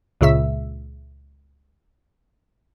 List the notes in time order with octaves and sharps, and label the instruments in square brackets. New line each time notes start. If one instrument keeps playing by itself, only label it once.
[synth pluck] C#2 A#2 C#3 E5 E6